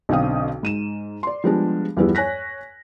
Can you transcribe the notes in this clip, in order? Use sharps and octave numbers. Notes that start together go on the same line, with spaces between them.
B1 D3 C4 F5 G5 D#6
G#2 D#7 E7
D5 C6
F3 G3 G#3 B3 D4 G4
E2 G2 F3 G3 B3 E4
C#5 G#5 F#6 A#6 B6